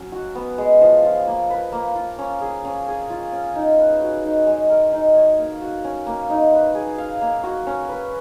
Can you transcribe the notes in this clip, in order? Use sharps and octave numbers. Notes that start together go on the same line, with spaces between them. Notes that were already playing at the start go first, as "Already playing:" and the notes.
Already playing: F#3 C#4
F#4
B3
G#3
F3
F4
A#3
B4
A#3
F4
C#4
G#4
C#4
G#4
F4
C#4
D#4
B4
F#4
D#4
G#3
A#4
D#4
C#5
A#3
F#4
C#4
A#3
D#4
B4
G#4
F5
A#3
F#4
C#4
B4